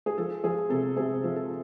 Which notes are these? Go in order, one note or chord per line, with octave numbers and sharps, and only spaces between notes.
G#4
F3 A4
F3 G#4
C3 A4
C3 G#4
F3
A4